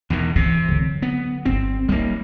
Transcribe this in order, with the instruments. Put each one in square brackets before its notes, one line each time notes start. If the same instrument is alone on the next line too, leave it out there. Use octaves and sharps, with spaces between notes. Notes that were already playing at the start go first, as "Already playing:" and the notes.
[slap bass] E2 B2 D#3
[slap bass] C3 [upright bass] E3
[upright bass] D3 F#3
[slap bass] B3
[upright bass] G1 [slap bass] C4
[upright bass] F#3 D#4 [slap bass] G3 A#3